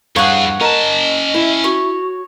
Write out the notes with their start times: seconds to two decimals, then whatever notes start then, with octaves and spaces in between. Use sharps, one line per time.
0.16 E2 G2 G#4 C#5 F5 F#5
0.61 C#4 A#4 D#5 A5
1.35 E4
1.64 F#4 C#5